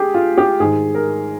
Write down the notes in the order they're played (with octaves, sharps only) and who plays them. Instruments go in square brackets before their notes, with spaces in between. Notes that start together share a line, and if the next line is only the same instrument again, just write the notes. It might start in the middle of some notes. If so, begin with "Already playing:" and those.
Already playing: [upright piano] G4 G#4
F4
G4
G#2 D#3 G#4
A#4